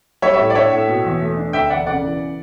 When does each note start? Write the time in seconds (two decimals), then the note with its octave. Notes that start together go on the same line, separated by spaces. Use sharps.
0.22 G3 C#5 E5
0.33 C#5 E5
0.39 A2
0.50 D5
0.55 D4 C#5 E5
0.72 A2
0.88 B2
1.04 E2
1.21 A3
1.37 D4
1.53 D2 E5 G5
1.70 E1 D5 F#5
1.87 C#3 D5 F#5
2.03 E3